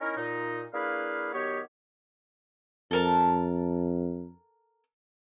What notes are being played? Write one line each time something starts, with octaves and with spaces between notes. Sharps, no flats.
C#4 D#4 E4 A#4
A#2 D#4
A#3 D4 E4 G#4 B4 F5
D#3 F#3 B3 G4 C#5
F2 A4 A#4 A5